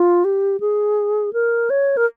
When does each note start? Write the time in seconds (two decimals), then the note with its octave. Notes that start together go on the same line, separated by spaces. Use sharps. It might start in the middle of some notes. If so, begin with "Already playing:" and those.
Already playing: F4
0.24 G4
0.60 G#4
1.33 A#4
1.70 C#5
1.97 A#4